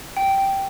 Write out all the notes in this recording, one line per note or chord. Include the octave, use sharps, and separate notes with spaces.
G5